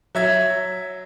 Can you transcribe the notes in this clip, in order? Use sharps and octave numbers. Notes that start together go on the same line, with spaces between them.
F#3 E5 G#6